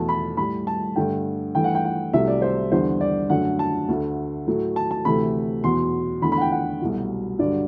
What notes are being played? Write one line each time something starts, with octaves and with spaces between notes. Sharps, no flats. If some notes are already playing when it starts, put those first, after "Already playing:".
Already playing: E2 B2 F#3 A3 A5
B5
A2 G3 B5
A5
G2 D3 A3 G5
G2 E3 A3 G5
F#5
G5
F#5
C2 C3 F#3 A3 E5
D5
C5
E2 D3 G3 C5
D5
F#2 D3 A3 F#5
A5
D2 D3 A3
A2 F#3 A3
A5
A5
D2 C3 E3 A3 B5
E2 B2 F#3 C6
E2 D3 A3 B5
B5
F#5
G5
F#5
C2 B2 F#3 A3
G2 D3 F#3 D5